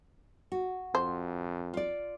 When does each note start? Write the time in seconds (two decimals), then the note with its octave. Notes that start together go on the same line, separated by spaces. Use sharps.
0.52 F#4
0.95 F2 C5
1.74 F4 D5